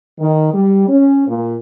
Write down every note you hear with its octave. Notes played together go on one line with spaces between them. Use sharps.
D#3
G3
C#4
A#2